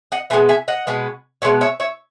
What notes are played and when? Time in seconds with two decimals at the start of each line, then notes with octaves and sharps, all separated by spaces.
0.12 D#5 F#5
0.30 B2 G#3 B3 E5 G#5
0.49 E5 G#5
0.68 D#5 F#5
0.87 B2 G#3 B3
1.42 B2 G#3 B3 C#5 E5
1.61 C#5 E5
1.80 C#5 E5